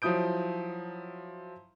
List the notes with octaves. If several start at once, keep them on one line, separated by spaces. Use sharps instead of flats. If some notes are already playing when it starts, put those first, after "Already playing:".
F3 F#3 E4 D#6 G6 D7